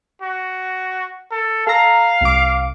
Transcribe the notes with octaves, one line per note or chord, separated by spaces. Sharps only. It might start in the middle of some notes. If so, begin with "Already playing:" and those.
F#4
A4
A4 F5 A#5
C2 D6